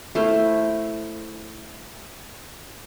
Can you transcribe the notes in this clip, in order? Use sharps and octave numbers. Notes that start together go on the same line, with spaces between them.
A3 E4 C5 F5